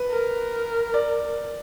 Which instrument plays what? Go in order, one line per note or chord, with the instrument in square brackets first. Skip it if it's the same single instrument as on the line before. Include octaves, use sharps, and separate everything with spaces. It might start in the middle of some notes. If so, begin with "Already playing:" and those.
Already playing: [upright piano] B4
[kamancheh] A#4
[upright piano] D5